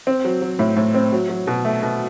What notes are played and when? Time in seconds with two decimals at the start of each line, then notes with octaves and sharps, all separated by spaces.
0.07 C4
0.24 F#3
0.42 F#3
0.59 A2
0.76 A2
0.94 C4
1.12 F#3
1.29 F#3
1.47 B2
1.65 A3
1.83 B2